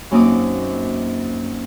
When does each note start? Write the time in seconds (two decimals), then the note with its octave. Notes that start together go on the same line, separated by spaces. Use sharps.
0.11 F#2 A#3 C4 D#4 D6 D#6